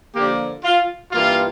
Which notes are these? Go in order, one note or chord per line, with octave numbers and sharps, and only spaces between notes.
D3 F3 A#3 G4
F4
G2 E3 A#3 F4